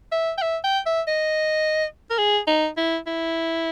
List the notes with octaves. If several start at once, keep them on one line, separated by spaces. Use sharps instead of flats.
E5
G5
E5
G5
E5
D#5
A#4
G#4
D#4
E4
E4